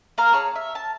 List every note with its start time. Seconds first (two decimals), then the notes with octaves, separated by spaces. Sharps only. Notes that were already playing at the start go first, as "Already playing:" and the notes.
0.18 A#3 F5 A#5 F6
0.32 G#4 C#5 A5 A#5
0.56 E5
0.75 A5